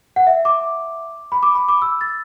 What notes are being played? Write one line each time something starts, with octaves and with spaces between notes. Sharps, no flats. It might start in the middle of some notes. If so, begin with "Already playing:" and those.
F#5
E5
D6
B5
D6
B5
D6
E6
A6